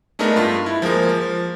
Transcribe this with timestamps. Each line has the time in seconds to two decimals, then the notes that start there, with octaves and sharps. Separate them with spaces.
0.19 G#3 A3 B3 D4 D#4 A#4
0.36 G2 F4
0.66 E4
0.82 F3 G#3 A#3 A#4
1.09 F3